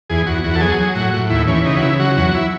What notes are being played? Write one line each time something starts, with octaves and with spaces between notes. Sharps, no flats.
E2 G#4
E2 F#4
E2 F#4
A4
F#3 G#4
F#3
A2 F#4
A2
D#2 E4
E3 C#4
C#3 D#4
F#4
C#3 E4
F#3 F#4
E2 F#4
E4